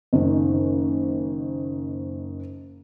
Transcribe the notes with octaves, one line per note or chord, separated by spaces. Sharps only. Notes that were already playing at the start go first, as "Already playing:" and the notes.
F#1 D#3